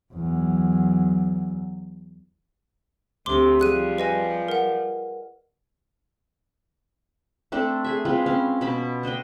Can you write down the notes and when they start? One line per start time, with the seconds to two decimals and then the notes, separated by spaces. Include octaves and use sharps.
0.14 E2 F#3
3.26 D2 C3 C6 D6
3.60 F3 G3 G#4 F#6 D#7
3.98 B4 D#5 G#5
4.48 A#4 F#5
7.52 A3 C4 D4 A4
7.84 G#4 E5
8.05 G#3 C4 F4 B4
8.26 C4 C#4 F5
8.61 B2 B3 A5 B5
9.03 D4 C5 D#5 G5